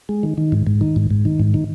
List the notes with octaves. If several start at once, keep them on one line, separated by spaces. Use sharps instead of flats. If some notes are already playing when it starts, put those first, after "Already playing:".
G#3
D#3
D#3
G#2
G#2
D#3
G#2
G#2
D#3
G#2
D#3